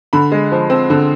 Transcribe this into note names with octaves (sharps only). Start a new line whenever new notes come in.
D3 B5
G#3
F3
C4
D3